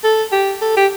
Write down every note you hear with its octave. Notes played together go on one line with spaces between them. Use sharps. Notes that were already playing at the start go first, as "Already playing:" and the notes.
A4
G4
A4
G4